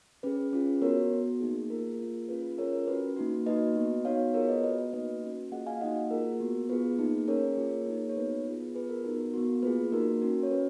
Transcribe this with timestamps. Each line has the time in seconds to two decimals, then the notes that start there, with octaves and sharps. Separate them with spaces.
0.23 C#4 G#4 B4
0.53 C#4 F4 G#4
0.82 B3 F#4 A#4 C#5
1.11 B3 F#4
1.41 A#3 D#4 G#4
1.70 A#3 F4 G#4 A#4
1.99 A#3 F4 G#4
2.29 C#4 F4 G#4 B4
2.58 C#4 F4 G#4 A#4 C#5
2.73 A#4
2.87 C#4 F#4 B4
3.17 A#3 D#4 F#4
3.46 A#3 D#4 F#4 B4 D#5
3.76 B3 F#4
4.05 B3 D#4 F#4 C#5 F5
4.34 B3 F4 G#4 A#4 C#5
4.49 B4 D#5
4.64 B3 F#4 B4 D#5
4.79 B4 D#5
4.93 A#3 D#4 F#4 B4 D#5
5.23 C#4 F#4
5.52 A#3 F4 G#4 D#5 F#5
5.66 F5 G#5
5.81 A#3 D#4 F#4 D#5 F#5
6.11 A#3 F4 G#4 A#4
6.40 B3 F#4
6.69 B3 F4 G#4 B4
6.98 A#3 D#4 G#4
7.28 C#4 G#4 A#4 C#5
7.57 A#3 F4 G#4
7.86 A#3 D#4 G#4
8.09 C#5
8.16 B3 D#4 F#4 B4
8.46 B3 F4 G#4
8.75 B3 F4 G#4 B4
8.90 A#4
9.04 B3 D#4 F#4 A#4
9.34 B3 F#4
9.63 A#3 F4 G#4 B4
9.92 A#3 D#4 F#4 A#4
10.22 C#4 F#4
10.43 C#5
10.51 C#4 F#4 B4